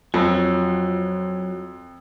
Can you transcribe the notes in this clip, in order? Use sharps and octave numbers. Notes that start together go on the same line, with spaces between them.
F2 F#3 F4